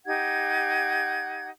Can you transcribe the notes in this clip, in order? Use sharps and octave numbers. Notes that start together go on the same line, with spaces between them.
D#4 G4 F#5 G#6